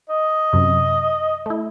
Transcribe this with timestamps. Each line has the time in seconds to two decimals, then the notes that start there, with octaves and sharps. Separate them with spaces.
0.09 D#5
0.53 F#2 C3
1.46 A3 E4